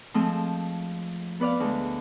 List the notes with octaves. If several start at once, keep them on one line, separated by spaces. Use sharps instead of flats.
F3 G#3 A3 C4 F4
B3 B4 D5 F5
D2 G#3